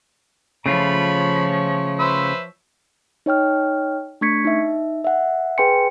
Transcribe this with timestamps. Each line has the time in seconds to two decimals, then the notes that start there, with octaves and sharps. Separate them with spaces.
0.66 C#3 F3 A3 F4 C#5 B5
1.99 B4 C5 E5
3.26 D#4 C#5 G5 F6
4.21 A3 D4 C#6 G#6 B6 C#7
4.45 D#4 E5
5.04 E5 F#5
5.58 G#4 B4 G5 G#5 C6 C#7